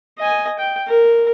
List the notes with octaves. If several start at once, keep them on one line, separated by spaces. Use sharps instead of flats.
D#5 G#5
G5
A#4